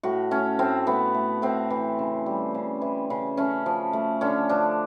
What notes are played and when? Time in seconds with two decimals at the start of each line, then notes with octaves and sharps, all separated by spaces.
0.03 A2 F#4
0.31 A3 C#4
0.59 A2 C4
0.87 A3 B3
1.14 A3
1.42 A2 C4
1.70 E3
1.99 C#3
2.26 G3
2.54 C#3
2.82 E3
3.10 C#3
3.37 A3 C#4
3.66 F3
3.93 A3
4.21 D3 C#4
4.49 F3 D4